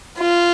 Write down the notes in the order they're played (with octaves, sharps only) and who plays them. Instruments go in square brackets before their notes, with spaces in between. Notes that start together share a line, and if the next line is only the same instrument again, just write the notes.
[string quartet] F4